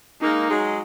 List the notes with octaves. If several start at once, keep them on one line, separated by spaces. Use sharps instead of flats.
G#3 A#3 D#4
F#3 G#3